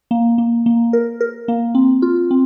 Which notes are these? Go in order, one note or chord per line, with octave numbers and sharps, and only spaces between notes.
A#3
A#3
A#3
A#4
A#4
A#3
C4
F4
C4